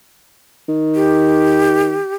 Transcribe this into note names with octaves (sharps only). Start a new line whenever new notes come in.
D#3
G4